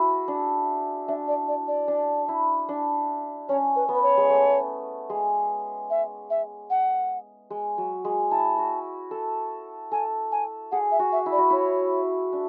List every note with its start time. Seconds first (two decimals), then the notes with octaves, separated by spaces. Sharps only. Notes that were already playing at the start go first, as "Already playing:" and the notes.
Already playing: E4 F#4 G#4
0.28 D4
1.08 D4 E5
1.28 D5
1.48 D5
1.68 D5
1.88 D4
2.28 E4
2.69 D4
3.49 C#4 C#5
3.76 B4
3.89 B3
3.95 B4
4.02 C#5
4.17 G#3
4.29 A3
5.10 G#3
5.90 E5
6.30 E5
6.70 F#5
7.50 G#3
7.78 F#3
8.05 G#3
8.31 E4 A5
8.58 F#4
9.11 A4
9.91 A4 G#5
10.32 G#5
10.72 G#4 F#5
10.92 E5
10.99 F#4
11.12 E5
11.26 E4
11.32 D5
11.38 F#4
11.50 E4 C#5
12.33 D4